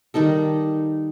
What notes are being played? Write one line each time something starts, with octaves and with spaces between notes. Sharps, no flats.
D#3 G3 D#4 A4